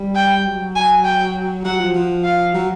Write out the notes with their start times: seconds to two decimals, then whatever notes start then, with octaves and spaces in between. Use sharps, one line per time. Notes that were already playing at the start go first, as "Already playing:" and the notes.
Already playing: G3
0.16 G5
0.46 F#3
0.76 G#5
1.05 G5
1.65 F#3 F#5
1.80 F3
1.94 F3
2.24 F5
2.54 F#3